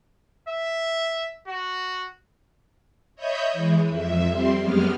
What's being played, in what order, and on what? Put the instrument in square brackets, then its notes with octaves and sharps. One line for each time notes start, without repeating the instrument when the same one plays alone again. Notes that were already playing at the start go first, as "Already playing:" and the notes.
[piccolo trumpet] E5
F#4
[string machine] C#5 D#5 E5 B5 G6
E3 G#3
F2 E5
G3 C4 C6
F#2 G#3 B3 G4 F6